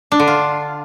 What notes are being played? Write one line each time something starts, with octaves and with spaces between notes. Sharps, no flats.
D4
D3
F4